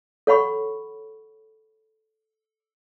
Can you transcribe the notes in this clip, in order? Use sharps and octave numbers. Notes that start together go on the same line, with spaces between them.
A4 C#5 F#5 B5 C#6